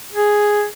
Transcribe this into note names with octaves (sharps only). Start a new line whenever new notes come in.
G#4